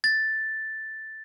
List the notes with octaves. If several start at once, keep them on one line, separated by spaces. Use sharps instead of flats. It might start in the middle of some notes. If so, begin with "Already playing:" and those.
A6